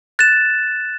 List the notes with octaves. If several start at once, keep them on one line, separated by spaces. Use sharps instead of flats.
F#6 A6 E7